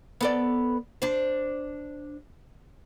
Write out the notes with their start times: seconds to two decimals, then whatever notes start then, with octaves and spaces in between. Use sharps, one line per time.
0.21 B3 A4 D5
1.02 D4 C5